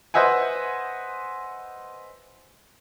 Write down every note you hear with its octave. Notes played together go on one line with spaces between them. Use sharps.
B4 C5 D#5 E5 F#5 G#5